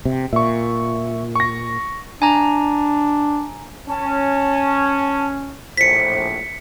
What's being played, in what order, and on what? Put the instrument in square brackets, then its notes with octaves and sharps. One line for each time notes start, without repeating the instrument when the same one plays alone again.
[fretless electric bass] C3
[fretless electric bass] A#2 [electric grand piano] E5 C#6
[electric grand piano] C#6 A#6
[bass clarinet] D4 [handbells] G#5 A#5
[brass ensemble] C#4 [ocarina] A5
[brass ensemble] A#1 A2 [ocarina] C5 [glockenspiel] B6 C#7